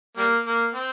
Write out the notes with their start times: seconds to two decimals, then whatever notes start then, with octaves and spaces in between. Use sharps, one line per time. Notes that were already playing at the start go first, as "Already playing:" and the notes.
0.17 G3 A#3
0.46 A#3
0.73 C4